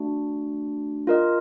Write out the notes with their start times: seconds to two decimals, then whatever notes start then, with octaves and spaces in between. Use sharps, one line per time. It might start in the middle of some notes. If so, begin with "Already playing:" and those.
Already playing: A3 D4 F#4
1.07 F4 A#4 D#5